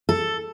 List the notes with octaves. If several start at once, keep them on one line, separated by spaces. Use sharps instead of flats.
A4